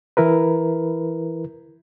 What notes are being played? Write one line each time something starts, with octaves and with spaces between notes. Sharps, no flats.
E3 E4 A#4 B4